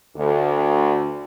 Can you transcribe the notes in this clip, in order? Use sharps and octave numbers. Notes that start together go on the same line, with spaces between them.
D2